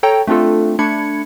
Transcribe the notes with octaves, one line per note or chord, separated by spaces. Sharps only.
A4 C#5 G5 A#5
A3 C4 D4 F4 A4
A3 D4 B5 G#6 C#7